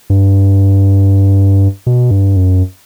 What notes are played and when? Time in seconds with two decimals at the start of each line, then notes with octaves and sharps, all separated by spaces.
0.10 G2
1.86 B2
2.11 G2
2.36 F#2